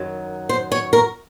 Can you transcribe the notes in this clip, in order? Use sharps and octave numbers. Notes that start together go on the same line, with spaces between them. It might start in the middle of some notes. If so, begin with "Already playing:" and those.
Already playing: F#2 D#3 F#3
C5
C#5
A#4